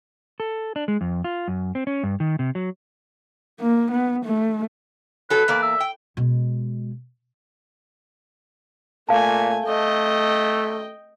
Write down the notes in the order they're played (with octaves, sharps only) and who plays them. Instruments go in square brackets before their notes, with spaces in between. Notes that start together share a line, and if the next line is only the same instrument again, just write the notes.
[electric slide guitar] A4
D4
G#3
F2
F4
F#2
C4
C#4
G2
D#3
C3
F#3
[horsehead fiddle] A#3
B3
A3
[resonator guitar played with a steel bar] F#3 A4 [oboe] B4
[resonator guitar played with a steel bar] E2 A#3 D5
[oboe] E5
[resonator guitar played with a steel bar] G5
[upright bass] B2 G#3
[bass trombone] A#2 [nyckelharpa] A3 G#5 [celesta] F5 A5
[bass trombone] A3 [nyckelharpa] D#5 G5